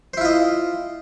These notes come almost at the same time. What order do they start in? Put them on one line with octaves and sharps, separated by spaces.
C5 E4 F4 D#5